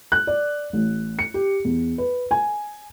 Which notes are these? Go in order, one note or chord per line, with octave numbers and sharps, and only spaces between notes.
F#6
D5
A1
C#7
G4
E2
B4
G#5